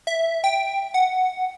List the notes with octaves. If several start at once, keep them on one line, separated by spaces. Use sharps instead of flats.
E5
G5
F#5